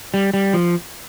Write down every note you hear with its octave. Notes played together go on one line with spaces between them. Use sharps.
G3
G3
F3